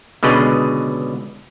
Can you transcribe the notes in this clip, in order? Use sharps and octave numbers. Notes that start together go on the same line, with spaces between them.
C#2 B2 D3 G#4 B4 D#5